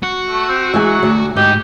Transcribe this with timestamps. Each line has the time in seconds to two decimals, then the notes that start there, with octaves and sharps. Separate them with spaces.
0.03 F#4
0.29 A3
0.49 C4
0.74 E3 F#3 G#3 G#5
1.03 D2
1.36 G#2 D#4 G4